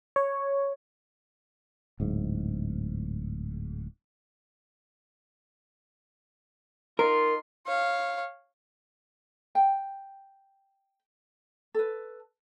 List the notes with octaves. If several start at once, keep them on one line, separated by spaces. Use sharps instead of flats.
C#5
D1 G#2
D#4 F4 A#4 C6
C#5 F5
G5
A4 B4